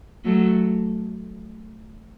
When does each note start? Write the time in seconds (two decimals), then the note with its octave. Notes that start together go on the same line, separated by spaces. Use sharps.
0.25 F#3 A3